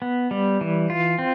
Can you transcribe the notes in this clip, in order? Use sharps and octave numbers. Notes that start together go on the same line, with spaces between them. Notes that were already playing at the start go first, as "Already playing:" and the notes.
B3
G3
E3
F4
C4